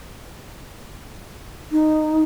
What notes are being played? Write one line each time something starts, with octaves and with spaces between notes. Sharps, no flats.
D#4